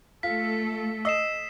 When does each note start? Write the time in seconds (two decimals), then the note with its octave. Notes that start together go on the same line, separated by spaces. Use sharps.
0.23 A3 F4 A4 B6
1.05 D#5 E6 C7 E7